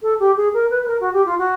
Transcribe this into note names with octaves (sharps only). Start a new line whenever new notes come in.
A4
G4
G#4
A#4
B4
B4
A#4
F#4
G4
F4
F#4